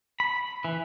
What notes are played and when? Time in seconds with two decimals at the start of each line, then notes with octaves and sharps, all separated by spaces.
0.20 B5
0.65 E3